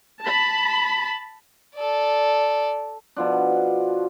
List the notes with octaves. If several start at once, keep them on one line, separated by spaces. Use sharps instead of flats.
A5 B5
A4 D5
B2 F3 D4